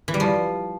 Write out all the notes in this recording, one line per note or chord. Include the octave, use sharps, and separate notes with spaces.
E3
G3
F3